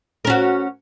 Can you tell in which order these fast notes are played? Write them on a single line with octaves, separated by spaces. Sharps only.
A#4 C#4 F#4